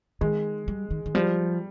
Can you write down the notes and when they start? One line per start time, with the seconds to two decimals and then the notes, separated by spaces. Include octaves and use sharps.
0.21 D#3 G#3
0.68 G3
0.91 D#3
1.06 D#3
1.15 F3 G3